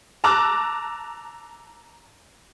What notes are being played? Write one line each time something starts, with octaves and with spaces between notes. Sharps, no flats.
A5 A#5 D6 E6 F#6